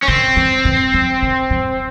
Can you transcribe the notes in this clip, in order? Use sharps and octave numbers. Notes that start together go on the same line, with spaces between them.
C#4
D#3 C4
E3
E3
F3
D#3
F3